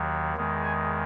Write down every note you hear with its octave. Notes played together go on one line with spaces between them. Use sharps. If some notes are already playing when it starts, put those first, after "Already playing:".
Already playing: D#2 D#3 F#3
E2 D#3 G#3
G#5